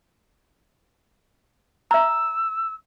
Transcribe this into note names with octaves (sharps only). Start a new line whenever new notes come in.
E5 A#5 E6